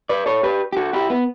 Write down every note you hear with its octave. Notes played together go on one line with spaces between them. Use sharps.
B4 D5
A4 C#5
G4 B4
G4
F#4 A4
E4 G4
B3